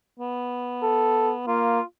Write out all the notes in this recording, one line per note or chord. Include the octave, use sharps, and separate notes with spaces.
B3
A4
A#3 F4